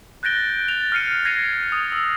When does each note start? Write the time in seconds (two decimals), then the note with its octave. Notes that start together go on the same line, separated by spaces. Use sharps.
0.23 F#6 G6 A6 A#6 D7 G7
0.68 A6 F7
0.92 F6 A#6 C7 C#7 D#7
1.25 G#6 A#6 C7 C#7 D#7 F7
1.72 D#6
1.92 E6